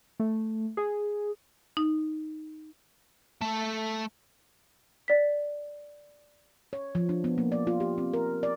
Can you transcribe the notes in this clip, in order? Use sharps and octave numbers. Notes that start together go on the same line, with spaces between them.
A3
G#4
D#4
A3 A4
D5 B6
C#5
F3
D4
B3
A#3
D5
F4
G4
C4
A#4
D5